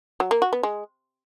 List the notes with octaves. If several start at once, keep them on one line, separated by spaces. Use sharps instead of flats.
F#3
A#3
F#4
B3
G#3